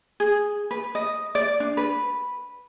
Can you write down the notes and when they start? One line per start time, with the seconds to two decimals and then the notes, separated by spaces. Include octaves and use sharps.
0.20 G#4
0.71 B4
0.95 D#5
1.35 D5
1.60 D4
1.77 B4